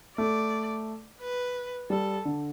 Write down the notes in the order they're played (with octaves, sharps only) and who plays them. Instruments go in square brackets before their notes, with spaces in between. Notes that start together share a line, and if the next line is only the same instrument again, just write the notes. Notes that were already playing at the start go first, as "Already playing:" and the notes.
[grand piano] A3 [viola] D5
[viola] B4
[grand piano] G3 [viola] A4
[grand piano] D3